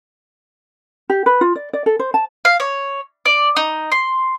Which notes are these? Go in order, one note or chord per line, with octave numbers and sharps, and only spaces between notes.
G4
B4
F4
D5
D5
A4
C5
A5
F5
C#5
D5
D#4
C6